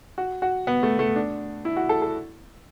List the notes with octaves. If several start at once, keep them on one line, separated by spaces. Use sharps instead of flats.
F#4
F#4
B3
A3
A3
D4
E4
F#4
A4
A4